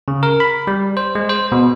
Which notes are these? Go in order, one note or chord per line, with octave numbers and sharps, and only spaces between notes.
C#3
A#4
B5
G3
C5
G#3
C5
B2